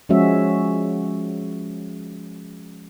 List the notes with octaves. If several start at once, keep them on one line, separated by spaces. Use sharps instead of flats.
F3 G#3 C#4 F#4 E5